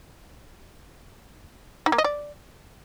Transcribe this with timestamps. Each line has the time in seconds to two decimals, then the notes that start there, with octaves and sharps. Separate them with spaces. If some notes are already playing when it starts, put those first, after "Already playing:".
1.86 D#4
1.92 A#3
1.98 D#5
2.04 D5